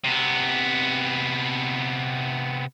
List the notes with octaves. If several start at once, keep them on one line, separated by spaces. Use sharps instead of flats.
C3 B3